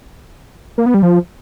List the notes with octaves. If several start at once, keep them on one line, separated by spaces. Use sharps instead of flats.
A#3
B3
G3
F3